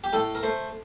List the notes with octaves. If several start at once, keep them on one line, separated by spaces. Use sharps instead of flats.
G4
A2 A4
A#4
A3 C5